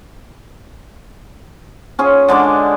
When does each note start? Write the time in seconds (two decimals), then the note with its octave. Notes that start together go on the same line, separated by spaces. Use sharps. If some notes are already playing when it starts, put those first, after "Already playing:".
1.99 C#4 F4 G#4
2.28 D3 G#3 D4 D6